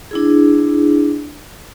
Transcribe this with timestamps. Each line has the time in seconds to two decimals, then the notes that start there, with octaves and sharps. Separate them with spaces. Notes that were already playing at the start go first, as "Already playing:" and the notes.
0.11 D4 E4 G#4